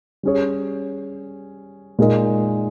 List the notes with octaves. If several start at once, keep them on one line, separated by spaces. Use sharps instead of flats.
G3 C#4 G#4 C#5
A#2 G#3 D#4 A#4 D#5